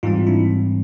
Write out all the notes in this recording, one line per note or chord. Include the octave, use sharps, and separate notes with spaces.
G#2 E3 G3 C4 D#4 F4
D4 E4